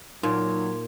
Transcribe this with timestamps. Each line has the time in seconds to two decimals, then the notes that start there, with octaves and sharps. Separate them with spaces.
0.23 A#2 F#3 D#4 C6